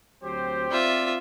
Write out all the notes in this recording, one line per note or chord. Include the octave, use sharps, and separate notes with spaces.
D2 F#3 C4 G4 C5
C4 F4 D5 E5